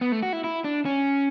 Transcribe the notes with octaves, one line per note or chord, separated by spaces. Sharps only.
B3
A3
F#4
E4
E4
D4
C#4